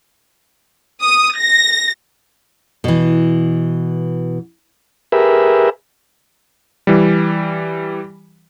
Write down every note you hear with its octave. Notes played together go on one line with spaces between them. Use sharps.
D#6
A#6
B2 E3
G4 G#4 A#4 B4 E5
E3 G3